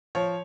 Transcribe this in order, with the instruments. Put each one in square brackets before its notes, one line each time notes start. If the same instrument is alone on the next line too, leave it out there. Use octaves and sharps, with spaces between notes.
[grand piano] F3 C#5